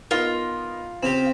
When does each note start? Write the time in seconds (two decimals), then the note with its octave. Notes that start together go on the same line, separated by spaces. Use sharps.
0.11 B3 D#4 F4 A#4
1.03 C#3 C4 G4